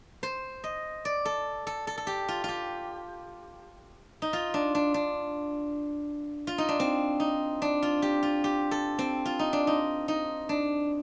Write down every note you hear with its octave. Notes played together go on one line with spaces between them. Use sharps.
C5
D#5
D5
A4
A4
A4
A4
G4
F4
F4 G4
D#4
F4
D4
D4
D4
F4
D#4
D4
C4
D#4
D4
F4
G4
F4
G4
A4
C4
F4
D#4
D4
D#4
D#4
D4